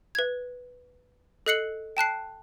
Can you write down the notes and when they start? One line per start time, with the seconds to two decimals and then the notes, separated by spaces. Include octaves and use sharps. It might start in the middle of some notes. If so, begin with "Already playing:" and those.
0.15 B4 G#6
1.46 A4 D#5 F#6 C7 C#7 F#7
1.97 G5 A5 F#6 C7